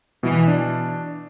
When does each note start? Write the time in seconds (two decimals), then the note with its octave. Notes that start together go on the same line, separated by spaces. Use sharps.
0.23 B2 E3
0.48 D4